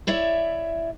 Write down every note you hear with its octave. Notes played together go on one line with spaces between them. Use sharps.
E4 C#5 D5 E5